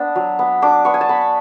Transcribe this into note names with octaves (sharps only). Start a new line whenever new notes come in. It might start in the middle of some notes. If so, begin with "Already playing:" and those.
Already playing: B3 D4
F#3
B3
D4 D6
B3 C#6
G#5
A5
B3 B5